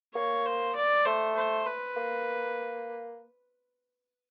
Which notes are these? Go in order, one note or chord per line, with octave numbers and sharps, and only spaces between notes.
A#3 C#5
C5
D5
A3 C5
C5
B4
A#3